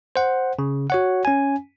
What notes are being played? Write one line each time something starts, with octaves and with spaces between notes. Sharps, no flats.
C5 F#5
C#3
F#4 C#5 F#5
C#4 G#5